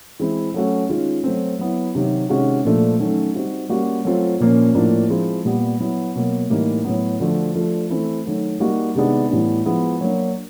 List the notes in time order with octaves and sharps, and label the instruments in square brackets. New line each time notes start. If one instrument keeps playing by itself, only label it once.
[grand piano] E3 G#3 C4 E4
F#3 A3 C#4 F#4
D#3 G#3 C#4 F4
F#3 A3 C4
F#3 B3 E4
C3 D#3 F#3
C3 D#3 G#3 C#4 F#4
A#2 F3 A3 D4
D#3 F#3 A3 C#4
G3 C4 D#4 F#4
G3 A#3 C#4 F#4
F#3 A3 C4 F4
A#2 F3 A#3 C#4
A2 F3 A#3 D4 F4
F3 G#3 C4 E4
A#2 G3 B3
F#3 B3 E4
B2 F#3 A#3
A2 E3 G3 A#3 D#4
A2 F#3 B3
D3 F3 A3 D4 F#4
F3 A3 D4 F4
E3 A3 C4 E4
D#3 F#3 A3
G3 A#3 D#4 F#4
C3 D#3 G#3 B3 D4
A2 E3 G3 B3 D4
F3 G#3 B3 E4
F#3 A#3 D4